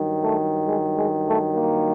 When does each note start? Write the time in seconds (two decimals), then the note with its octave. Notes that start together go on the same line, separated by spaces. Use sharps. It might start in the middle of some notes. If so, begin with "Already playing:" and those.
Already playing: G2 D#3 F#3
0.22 A3
0.66 G#3
0.95 G#3
1.25 A3
1.54 A#3